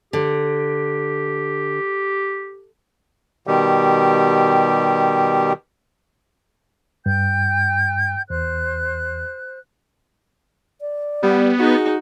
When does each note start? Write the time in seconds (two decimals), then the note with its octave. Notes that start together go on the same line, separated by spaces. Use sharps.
0.13 D3 G4
3.47 B2 D#3 G3 G4
7.06 G2 G5 G6
8.30 E2 C5 F#6
10.81 D5
11.23 G3 B3
11.59 D#4 F#4 G#4